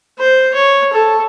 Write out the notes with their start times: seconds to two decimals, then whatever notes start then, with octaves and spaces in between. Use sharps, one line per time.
0.19 C5
0.54 C#5
0.93 A4